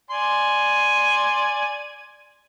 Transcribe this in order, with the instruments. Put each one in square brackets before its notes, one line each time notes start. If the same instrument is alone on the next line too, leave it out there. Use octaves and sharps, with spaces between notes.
[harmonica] D5 G#5 C6